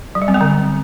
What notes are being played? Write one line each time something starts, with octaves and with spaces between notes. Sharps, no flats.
F#3
G3
C4
B3
D3